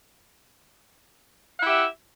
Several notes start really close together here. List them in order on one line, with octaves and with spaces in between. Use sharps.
F#5 E4 G4 E5